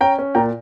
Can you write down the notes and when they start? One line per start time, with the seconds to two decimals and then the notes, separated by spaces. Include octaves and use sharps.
0.01 C#4 G5 A#5
0.19 C#4
0.35 A#2 G5 A#5